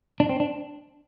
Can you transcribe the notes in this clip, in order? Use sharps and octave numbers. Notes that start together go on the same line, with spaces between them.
D4
C4
D4